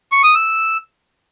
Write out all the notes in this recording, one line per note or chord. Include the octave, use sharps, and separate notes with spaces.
C#6
D#6
E6